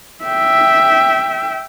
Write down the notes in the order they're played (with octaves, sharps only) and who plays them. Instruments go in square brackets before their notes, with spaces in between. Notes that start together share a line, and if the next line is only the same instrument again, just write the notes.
[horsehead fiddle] E5 G5